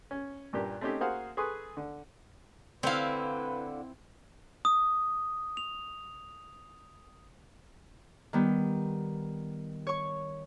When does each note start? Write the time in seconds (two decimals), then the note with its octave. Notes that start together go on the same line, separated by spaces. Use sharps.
0.11 C#4
0.53 G2 A#2 A#3 G4
0.81 A3 C4 C#4 D#4 G4
1.00 A#3 F#4 G#4 C5 F5 F#5
1.37 G#4 A4 B4 C6 C#6 D#6
1.77 D3
2.83 D3 C4 E4 B4 F5
4.65 D#6
5.57 F7
8.33 D#3 G3 B3
9.87 C#5 C#6